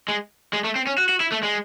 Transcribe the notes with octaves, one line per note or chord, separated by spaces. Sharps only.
G#3
G#3
A3
C4
C#4
F#4
F#4
E4
A3
G#3